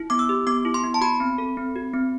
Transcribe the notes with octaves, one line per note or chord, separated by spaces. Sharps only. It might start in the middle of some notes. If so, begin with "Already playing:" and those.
Already playing: E4
B3 D6
E6
G4
B3 D6
E4
C6
B3
A5
F#4 B5
C4
A4
C4
F#4
C4